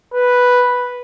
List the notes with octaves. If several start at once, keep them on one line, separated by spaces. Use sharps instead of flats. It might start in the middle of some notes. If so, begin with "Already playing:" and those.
B4